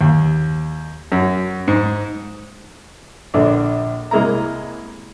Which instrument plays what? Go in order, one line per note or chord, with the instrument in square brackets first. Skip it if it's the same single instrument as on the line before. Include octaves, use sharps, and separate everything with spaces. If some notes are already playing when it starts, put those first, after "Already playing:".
[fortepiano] D#2
F#2
G#2
A#1 D3 D5
C2 G#3 A#3 E4 A#5